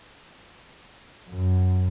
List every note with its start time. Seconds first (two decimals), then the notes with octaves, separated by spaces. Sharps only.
1.29 F#2